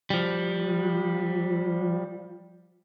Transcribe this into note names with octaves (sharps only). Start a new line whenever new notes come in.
F3 G3